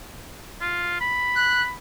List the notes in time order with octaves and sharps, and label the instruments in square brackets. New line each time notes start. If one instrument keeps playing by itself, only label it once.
[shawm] F4
B5
[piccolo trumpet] F#6